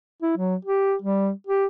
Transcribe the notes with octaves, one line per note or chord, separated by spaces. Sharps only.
E4
F#3
G4
G3
G4